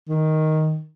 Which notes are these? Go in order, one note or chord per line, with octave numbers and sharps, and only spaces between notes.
D#3